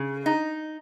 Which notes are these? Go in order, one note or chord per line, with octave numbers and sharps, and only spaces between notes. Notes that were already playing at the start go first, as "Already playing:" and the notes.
Already playing: C#3
D#4